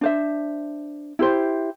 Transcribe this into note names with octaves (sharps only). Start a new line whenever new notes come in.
D4 C5 E5
E4 G4 C5